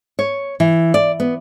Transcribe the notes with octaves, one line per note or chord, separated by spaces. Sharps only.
C#5
E3
D5
B3